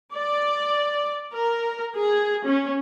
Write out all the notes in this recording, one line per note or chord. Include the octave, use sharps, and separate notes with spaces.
D5
A#4
G#4
C#4